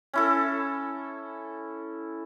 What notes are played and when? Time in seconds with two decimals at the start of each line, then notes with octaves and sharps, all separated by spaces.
0.13 C#4 E4 A4